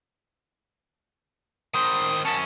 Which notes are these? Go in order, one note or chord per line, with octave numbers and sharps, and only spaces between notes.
D#3 C5 D#6
F#2 C#4 A5